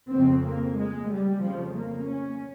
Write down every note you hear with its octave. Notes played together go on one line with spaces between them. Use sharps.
F2 C#3 C4
A#3
G#3
G3
F2 C#3 F3
A#3
C#4